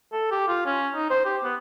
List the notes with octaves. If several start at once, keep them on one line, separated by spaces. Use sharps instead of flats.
A4
G4
F4
C#4
D#4
C5
G4
B3